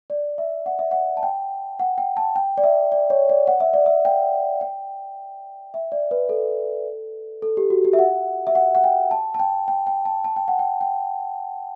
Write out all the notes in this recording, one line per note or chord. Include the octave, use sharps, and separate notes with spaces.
D5
E5
F#5
E5
F#5
A5
G5
F#5
G5
A5
G5
D5
E5
D5
C#5
D5
F#5
E5
D5
E5
G5
G5
E5
D5
B4
A4
A4
G4
F#4
G4
E5
F#5
E5
F#5
F#5
G5
A5
A5
G5
G5
G5
A5
A5
G5
F#5
G5
G5